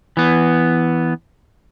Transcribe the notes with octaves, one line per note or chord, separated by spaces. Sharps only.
E3 B3